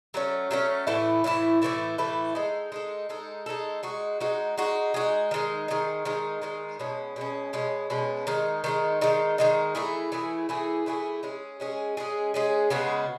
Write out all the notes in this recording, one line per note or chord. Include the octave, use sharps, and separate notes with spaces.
F#3 A3 C#4
F#3 A3 C#4
A2 E3 A3 E4
A2 E3 A3 E4
A2 E3 A3 E4
A2 E3 A3 E4
G#3 D#4 A4
G#3 D#4 A4
G#3 D#4 A4
G#3 D#4 A4
G#3 D#4 F#4
G#3 D#4 F#4
G#3 D#4 F#4
G#3 D#4 F#4
D#3 G#3 D#4
D#3 G#3 D#4
D#3 G#3 D#4
D#3 G#3 D#4
B2 G#3 C#4
B2 G#3 C#4
B2 G#3 C#4
B2 G#3 C#4
D#3 G#3 D#4
D#3 G#3 D#4
D#3 G#3 D#4
D#3 G#3 D#4
E3 A3 E4 G#4
E3 A3 E4 G#4
E3 A3 E4 G#4
E3 A3 E4 G#4
G#3 C#4 G#4
G#3 C#4 G#4
G#3 C#4 G#4
G#3 C#4 G#4
C#3 G#3 B3 F#4